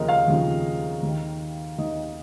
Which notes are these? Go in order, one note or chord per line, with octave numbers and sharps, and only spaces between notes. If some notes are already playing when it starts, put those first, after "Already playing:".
Already playing: D#2 C#3 F3 A#4 D#5
F5
D#2 C#3 F3
D#2 D#3
D#2 D#3 D#5